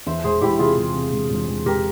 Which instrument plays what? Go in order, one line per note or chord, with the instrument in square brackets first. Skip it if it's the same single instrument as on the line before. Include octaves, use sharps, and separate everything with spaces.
[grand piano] E2 [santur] C5 E5
[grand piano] E1 [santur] G#4 C5
[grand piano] E1 [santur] E4 G4
[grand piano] C3 [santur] F4 G#4
[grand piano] E1
C3
E1
E1
E1
[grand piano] E1 [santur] G4 A#4